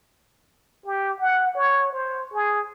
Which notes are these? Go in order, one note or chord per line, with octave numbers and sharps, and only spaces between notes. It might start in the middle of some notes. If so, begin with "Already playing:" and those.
G4
F#5
C#5
C5
G#4